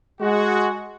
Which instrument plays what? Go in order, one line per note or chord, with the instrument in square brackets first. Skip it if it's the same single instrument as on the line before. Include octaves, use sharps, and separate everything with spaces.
[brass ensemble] G#3 F#4